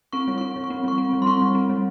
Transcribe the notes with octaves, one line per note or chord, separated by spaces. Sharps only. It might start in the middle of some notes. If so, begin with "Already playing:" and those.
C4 C#6
G3
C4 C#6
G3
C#6
C4
G3 C#6
C4
G3
C6
C4 C#6
G3
C4
G3